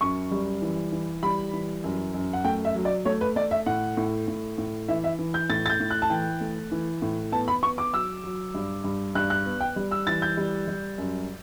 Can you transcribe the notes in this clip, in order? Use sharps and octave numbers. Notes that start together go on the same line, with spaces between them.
F#2 C#6
G3
E3
E3
G3 B5
E3
F#2
F#2
F#5
A3 G5
E5
F#3
D5
A3 C#5
B4
A3 D5
E5
A2 F#5
A2
A2
A2
E3 E5
E5
E3
G6
A2 A6
A6
G6
A2
F#6
A5
E3 G5
A3
E3
A2
B3 A5
B5
B3 C#6
D6
F#3 E6
F#3
G2
G2
G2 F#6
F#6
B3
G5
G3
E6
E3 A6
G6
G3
G3
F#2